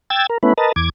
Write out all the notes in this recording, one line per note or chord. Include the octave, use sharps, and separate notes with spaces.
G5 E6 G#6 A6
A#4
A3 B3 C#4 E4 B4
A#4 B4 D#5 A5
E2 D6 G#6